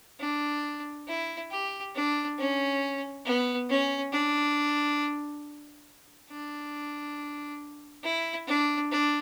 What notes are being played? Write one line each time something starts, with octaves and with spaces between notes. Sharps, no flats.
D4
E4
G4
D4
C#4
B3
C#4
D4
D4
E4
D4
D4